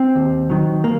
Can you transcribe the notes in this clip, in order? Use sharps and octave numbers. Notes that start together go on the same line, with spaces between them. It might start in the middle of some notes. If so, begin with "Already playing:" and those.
Already playing: C4
D#2
D#3 F#3
A#3